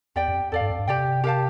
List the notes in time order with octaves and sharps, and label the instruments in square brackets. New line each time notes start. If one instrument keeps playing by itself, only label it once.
[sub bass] E2 [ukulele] G4 D5 G5
[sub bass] F2
[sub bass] F2 [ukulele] A4 D5 F5
[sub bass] G2
F2
G2
[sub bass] C3 [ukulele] G4 D5 G5
[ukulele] G4 A#4 F5 A5